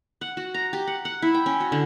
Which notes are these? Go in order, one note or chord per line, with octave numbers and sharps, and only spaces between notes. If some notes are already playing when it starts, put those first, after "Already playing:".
F#5
F#4
A#5
G4
F#5
F#5
E4
G5
C#4
F#4
D3